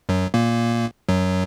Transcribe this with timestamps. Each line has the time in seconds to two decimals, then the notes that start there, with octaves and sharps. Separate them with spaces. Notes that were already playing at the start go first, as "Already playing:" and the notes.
0.09 F#2 F#3
0.34 A#2 A#3
1.09 F#2 F#3